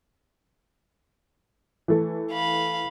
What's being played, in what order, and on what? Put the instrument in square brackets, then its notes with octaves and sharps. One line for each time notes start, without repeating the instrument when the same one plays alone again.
[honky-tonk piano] E3 A3
[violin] F5 B5